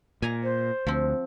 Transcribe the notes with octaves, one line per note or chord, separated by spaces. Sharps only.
A#2 G#5 A#5
C5
D2 F3 C4